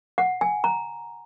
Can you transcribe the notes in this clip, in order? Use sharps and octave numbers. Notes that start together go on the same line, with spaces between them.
F#5
G#5
A#5